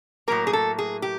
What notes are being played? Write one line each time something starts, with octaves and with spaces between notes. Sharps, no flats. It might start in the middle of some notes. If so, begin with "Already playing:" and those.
A2 F#3 A#3 A#4
G#4
A4
G#4
G4